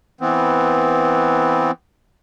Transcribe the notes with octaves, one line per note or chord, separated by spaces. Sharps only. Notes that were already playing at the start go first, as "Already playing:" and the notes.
E3 B3 C4